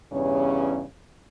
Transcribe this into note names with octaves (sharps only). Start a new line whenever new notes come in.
E2 G2 C#3 C#4